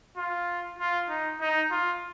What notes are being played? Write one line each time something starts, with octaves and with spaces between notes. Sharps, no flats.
F4
F4
D#4
D#4
F4